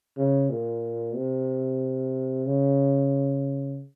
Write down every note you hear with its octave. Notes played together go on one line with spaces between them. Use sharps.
C#3
A#2
C3
C#3